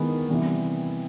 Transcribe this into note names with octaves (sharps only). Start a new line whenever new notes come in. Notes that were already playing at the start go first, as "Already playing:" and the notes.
Already playing: D#3 G#3 B3 E4
C3 E3 G3 B3